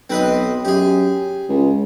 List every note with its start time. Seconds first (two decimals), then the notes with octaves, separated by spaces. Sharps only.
0.10 B1 C4 B4 D#5
0.65 F#2 G4 G#4
1.49 C#2